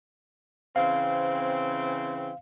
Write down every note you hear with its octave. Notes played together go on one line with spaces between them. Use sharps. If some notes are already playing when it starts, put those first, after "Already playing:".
C#3 E3 C4 F5